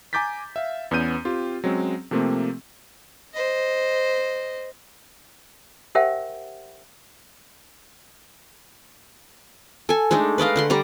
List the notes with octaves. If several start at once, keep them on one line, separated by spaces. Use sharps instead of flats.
G#5 A#5 D6 G6 A6 B6
E5 F5
E2 B3 C#4 G6 D#7
C4 F4 G4
F#3 G#3 C4 C#4
C3 F3 A3 A#3 C4
C5 D#5
G4 A#4 C5 E5 F#5 G5
A4 G#5
G#3 A3 D4 D#4
B4 D5 D#5 F5
D3 F#5 C6
G3 D5 A#5